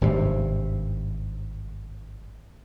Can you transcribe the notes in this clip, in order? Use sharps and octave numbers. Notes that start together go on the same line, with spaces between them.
G#1 G2 C3